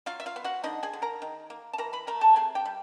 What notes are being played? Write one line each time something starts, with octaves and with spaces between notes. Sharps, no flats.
F#3 F4 F5
E5
F4 F5
B3
F#4 F#5
D3 D#4 D#5
G#4 G#5
D3
A#4 A#5
D#3
A#3
A5
E3 A#4 A#5
B4 B5
A3 A#4 A#5
A4 A5
C3 G#4 G#5
G4 G5
G3